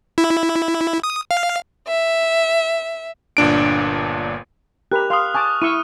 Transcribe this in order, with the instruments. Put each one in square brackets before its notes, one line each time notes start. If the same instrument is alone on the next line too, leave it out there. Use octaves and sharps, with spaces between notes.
[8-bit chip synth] E4
D#6
F5
[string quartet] E5
[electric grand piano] G1 A#2 D4 D7
[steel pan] G4 A#4 B5 [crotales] F#6 F7
[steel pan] F5 C6 [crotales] D#6 F6 F7
[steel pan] G#5 A5 D6 [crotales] C#6
[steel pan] E4 C#6 E6 [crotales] F6 D#7